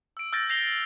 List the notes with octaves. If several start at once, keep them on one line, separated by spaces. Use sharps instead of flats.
E6 D7
E6 F6 G6 A6 A#6 D7
G6 A#6 C7 F7 G7